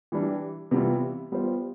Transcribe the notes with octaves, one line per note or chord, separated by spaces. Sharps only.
E3 G3 D4
C3 E3 G3 B3 F4
G3 B3 F4 C5